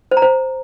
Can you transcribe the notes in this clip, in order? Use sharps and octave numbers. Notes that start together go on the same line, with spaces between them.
C5
A#5
C5